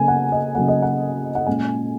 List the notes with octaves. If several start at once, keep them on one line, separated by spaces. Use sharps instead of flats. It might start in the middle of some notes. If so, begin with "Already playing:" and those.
Already playing: C#3 F#3 A#3 G#5
F#5
D#5
C#3 F#3 A#3 F#5
D#5
F#5
F#5
A#2 G#3 C#4 G#5